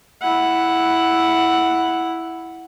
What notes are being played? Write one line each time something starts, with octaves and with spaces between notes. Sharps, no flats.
E4 F#5